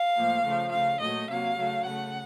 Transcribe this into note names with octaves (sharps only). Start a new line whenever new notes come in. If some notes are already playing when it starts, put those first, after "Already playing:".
Already playing: F5
A2 F3 A#3
C#3 F3 A3
C#3 A3 F5
A#2 F#3 A3 D#5
C3 F#3 A#3 F5
C#3 F#3 A3
C#3 A3 F#5